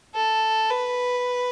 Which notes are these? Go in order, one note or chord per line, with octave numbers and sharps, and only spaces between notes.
A4
B4